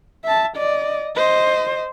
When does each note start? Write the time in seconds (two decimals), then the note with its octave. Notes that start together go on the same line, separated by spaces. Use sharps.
0.24 E5 A5
0.56 D5 D#5
1.16 C5 D#5